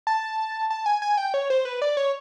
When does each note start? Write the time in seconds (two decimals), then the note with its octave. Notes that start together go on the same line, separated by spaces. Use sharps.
0.07 A5
0.70 A5
0.86 G#5
1.02 G#5
1.17 G5
1.34 C#5
1.50 C5
1.65 B4
1.82 D5
1.97 C#5